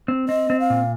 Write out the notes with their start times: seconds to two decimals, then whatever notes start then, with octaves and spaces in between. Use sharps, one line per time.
0.08 C4
0.29 C4 D#5
0.50 C4
0.60 F5
0.70 A#2